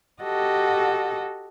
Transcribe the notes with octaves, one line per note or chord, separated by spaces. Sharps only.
F#4 G4 A4 D#5